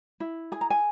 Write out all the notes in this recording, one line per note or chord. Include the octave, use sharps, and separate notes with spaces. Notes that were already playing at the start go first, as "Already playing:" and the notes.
E4
G#4 G#5
A#5
G#5